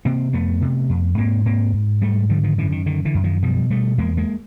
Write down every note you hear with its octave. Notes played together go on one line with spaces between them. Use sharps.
C3 A#3 C4
F2 A3 B3
C3
F2
G#2 A#3 C4
G#2 A#3 C4
G#2
G#2 G3 A3
D3 F3 G3
D#3 F3
F#2 D3 E3
D#3
D3 D#3
D3 E3
F#2
D#3 F3
B2 F3 G3
B2 G3 A3
E2 G#3 A#3
G#3 A#3